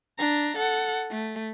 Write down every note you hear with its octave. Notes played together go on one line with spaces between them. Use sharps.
D4 A#5
A4 F#5
A3